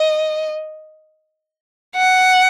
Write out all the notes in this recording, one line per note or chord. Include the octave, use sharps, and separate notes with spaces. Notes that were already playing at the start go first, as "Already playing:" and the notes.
Already playing: D#5
F#5